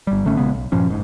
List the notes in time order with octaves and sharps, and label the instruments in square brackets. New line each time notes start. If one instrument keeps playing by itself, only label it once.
[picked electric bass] G1 G3
G#1 D3 A3 C#4
A#1 C#3 G#3 B3
B1
G2 A#2 F3 C#4
F#1 G#2